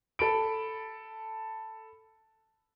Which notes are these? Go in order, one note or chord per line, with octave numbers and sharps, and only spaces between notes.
A4 B5 D7